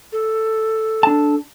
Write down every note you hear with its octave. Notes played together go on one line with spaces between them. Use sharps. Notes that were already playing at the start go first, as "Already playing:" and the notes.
A4
D4 A5